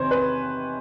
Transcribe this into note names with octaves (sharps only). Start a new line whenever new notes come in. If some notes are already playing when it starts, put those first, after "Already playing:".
Already playing: E2 C3 D#3 C5 C#5
B4